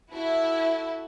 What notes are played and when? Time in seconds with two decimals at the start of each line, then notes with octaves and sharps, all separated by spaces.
0.13 E4 F#4 A4